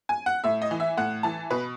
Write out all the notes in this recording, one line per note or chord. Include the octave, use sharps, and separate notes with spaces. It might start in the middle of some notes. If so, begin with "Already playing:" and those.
G#5
F#5
A2 E5
D#5
E3
E5
A2 F#5
E3 A5
B2 B4